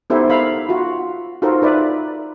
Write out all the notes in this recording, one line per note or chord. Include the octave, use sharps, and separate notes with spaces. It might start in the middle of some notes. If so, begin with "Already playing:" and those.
B3 D#4 E4 G4 A4 C5
A#4 E5 F5 B5
F4 F#4
D#4 F4 F#4 A4 A#4 C5
D#4 B4 D5 E5